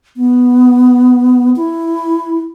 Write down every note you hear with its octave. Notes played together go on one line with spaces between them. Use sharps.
B3
E4